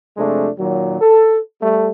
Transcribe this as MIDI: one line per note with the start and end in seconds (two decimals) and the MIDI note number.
0.17 0.49 41
0.17 0.49 48
0.17 0.49 56
0.17 0.49 57
0.17 0.49 62
0.58 0.99 46
0.58 0.99 51
0.58 0.99 54
1.01 1.40 69
1.62 1.90 55
1.62 1.90 57